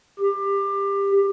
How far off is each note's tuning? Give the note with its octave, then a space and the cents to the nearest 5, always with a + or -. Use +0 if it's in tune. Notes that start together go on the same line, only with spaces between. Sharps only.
G4 +20